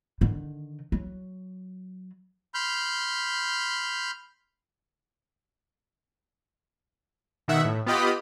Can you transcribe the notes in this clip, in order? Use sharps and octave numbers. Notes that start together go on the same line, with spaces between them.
D3 D#3
F#3
B5 C6 F6 G6
B2 D#3 E5 F#5
A2
B3 F4 G4 D#5 B5